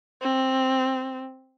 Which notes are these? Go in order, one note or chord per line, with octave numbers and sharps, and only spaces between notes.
C4